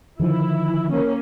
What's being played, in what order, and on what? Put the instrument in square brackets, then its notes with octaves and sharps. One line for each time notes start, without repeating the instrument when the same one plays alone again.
[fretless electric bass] D3 D#3 F3 [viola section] E4
[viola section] A#3 C#4